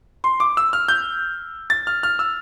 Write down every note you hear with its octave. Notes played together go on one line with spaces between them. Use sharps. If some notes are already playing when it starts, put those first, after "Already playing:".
C6
D6
E6
F6
G6
A6
F6
F6
E6